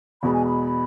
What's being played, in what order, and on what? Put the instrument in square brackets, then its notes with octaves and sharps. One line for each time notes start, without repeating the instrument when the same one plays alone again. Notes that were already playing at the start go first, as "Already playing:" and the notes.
[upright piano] E2 B2 G#3 [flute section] B5
[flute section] G#5
B5